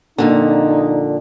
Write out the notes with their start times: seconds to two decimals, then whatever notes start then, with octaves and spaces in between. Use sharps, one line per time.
0.18 F2 A#2 D3 D#4